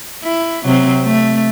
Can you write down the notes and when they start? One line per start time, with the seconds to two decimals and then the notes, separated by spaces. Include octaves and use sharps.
0.23 E4
0.65 C3 F#3 C4
1.03 A3